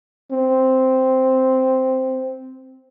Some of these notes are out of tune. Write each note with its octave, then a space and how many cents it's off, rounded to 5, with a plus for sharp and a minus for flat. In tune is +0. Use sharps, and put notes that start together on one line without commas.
C4 -5